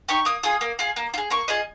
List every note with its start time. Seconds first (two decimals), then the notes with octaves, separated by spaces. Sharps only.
0.09 D#4 G4 C#6
0.25 A#3 D#6
0.43 F4 G#4 D#6
0.61 A#3
0.79 F4 G#4
0.96 A#3
1.14 F4
1.18 G#4
1.30 A#3 C#6
1.48 F4 G#4 D#5